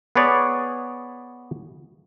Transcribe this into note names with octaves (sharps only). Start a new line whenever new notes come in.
B3 G#4 B4 C#5 D5